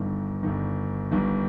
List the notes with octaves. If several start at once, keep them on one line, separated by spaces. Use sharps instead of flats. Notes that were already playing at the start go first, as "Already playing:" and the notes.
Already playing: G1 G2 D#3
G1 G2 D#3
G1 G2 D#3